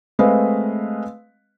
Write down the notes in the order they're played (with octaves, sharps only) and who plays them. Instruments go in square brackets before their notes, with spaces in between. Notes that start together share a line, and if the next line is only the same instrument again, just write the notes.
[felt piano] G#3 A3 C4 B4 D#5 F5